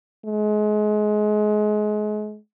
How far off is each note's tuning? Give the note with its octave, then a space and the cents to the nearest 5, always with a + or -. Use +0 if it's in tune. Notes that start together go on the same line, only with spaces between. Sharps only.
G#3 +30